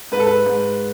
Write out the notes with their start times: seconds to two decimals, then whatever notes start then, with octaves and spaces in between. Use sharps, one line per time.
0.12 G#2 B4
0.20 A4
0.27 B4
0.46 G#2